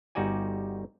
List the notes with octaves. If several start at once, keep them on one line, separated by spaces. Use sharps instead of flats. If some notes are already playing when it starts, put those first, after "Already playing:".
G1 G3 D#4 F#4 D5 G#5